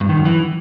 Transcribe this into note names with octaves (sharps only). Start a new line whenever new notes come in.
G2
D#3
F#2
E3